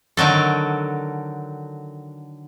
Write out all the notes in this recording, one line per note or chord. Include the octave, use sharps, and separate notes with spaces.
D3 D#3 F#3 A4